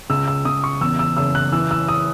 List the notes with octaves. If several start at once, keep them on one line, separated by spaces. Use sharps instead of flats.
C#2 E6
E6
C#2 D#6
C#6
E2 E6
E6
F#1 E6
F#6
E3 E6
E6
D#6